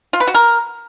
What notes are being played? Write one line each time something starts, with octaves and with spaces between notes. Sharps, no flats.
F4
B4
F#4
A#4